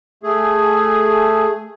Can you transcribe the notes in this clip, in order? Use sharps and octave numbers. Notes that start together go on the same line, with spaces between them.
A3 G#4